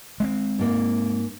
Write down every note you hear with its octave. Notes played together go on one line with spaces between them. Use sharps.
G#3 B3 C4
G#2 A#3